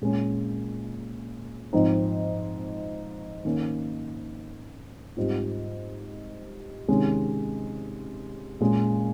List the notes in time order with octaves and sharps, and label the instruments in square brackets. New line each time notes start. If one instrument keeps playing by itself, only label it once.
[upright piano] A#2 G#3 C#4
G#2 F3 C4 D#4
D#3 A#3 C#4
G#2 G3 C4 F4
C3 D#3 G#3 C#4
A#2 G#3 C#4